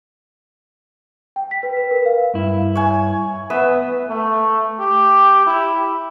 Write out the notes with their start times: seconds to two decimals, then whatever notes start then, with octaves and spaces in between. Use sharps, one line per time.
1.36 G5
1.51 B6
1.63 B4
1.77 B4
1.91 A#4
2.06 F5
2.34 G2 E4
2.76 C#5 G#5
3.50 B3 B4 E5
4.09 A3
4.80 G4
5.46 E4